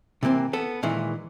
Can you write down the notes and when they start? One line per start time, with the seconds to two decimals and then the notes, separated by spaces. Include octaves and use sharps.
0.23 C3 E3 A#3 C4
0.53 B3 A4
0.83 A#2 D#3 E3 G#3